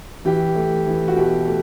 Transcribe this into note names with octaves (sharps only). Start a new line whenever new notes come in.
E3 G4
A3
E3
F#4
B2 G4
A3